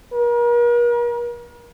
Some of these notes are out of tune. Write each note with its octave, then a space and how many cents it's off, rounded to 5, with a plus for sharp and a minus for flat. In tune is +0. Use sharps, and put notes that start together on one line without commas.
A#4 +40